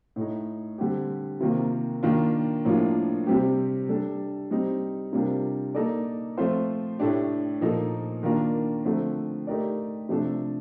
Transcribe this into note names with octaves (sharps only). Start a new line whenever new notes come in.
A2 A3 D#4
D3 G3 C4 G4
C3 D#3 A#3 F4
D#3 A#3 D4 F4
A2 F3 A#3 D4 F4
C3 G3 C4 G4
G3 D4 A4
G3 C4 D#4
C3 G3 D4 F4 A#4
A#3 D#4 A4 D5
F3 A3 C4 F4 C5
A2 A3 D4 G4
A#2 F3 A#3 D#4 A4
D#3 A#3 D4 F4 A#4
D3 F3 A3 C4
A3 D#4 G4 A#4 D5
C3 F3 A3 D4 A4